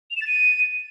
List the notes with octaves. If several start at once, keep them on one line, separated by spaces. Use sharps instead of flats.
F7
E7
A6
D#7